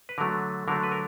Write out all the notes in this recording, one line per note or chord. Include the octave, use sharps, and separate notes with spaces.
B4
D3 F#3 A3 A#4
D3 F#3 A3 A#4
B4
A#4